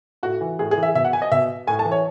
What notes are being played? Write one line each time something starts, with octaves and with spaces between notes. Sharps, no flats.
A2 F#4
E3
A2 G#4
G#4
E3
E5
B2 E5
F#5
G#5
D#5
B2 E5
A2 G#5
A5
E3
C#5